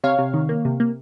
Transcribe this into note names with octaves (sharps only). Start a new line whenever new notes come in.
C3 C#5 F5
C3
D#3
A#3
C3
A#3